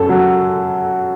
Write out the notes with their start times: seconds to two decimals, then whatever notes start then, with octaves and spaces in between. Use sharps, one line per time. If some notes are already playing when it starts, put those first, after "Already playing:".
Already playing: F#2 A4
0.09 F#3